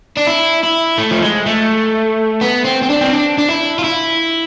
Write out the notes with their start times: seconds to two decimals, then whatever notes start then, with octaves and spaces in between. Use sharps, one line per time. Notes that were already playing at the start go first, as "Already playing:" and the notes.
0.17 D4
0.27 E4
0.63 E4
0.98 A3
1.11 F3
1.22 G#3
1.46 A3
2.41 B3
2.64 C4
2.82 C4
2.89 D4
3.01 C4
3.13 D4
3.39 D4
3.49 E4
3.79 F4
3.84 E4